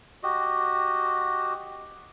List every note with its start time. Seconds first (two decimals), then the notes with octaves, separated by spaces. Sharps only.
0.23 F#4 G4 D#5